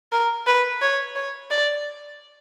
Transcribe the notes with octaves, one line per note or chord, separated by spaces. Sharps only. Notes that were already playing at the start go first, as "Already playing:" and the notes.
A#4
B4
C#5
C#5
D5